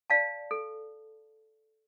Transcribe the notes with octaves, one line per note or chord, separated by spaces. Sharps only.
D5 F5 A5
A4